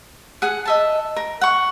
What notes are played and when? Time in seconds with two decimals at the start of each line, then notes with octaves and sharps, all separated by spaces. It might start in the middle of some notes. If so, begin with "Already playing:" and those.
0.42 G#4 F#5
0.65 D#5 E5 A5
1.17 A#4
1.41 F#5 C#6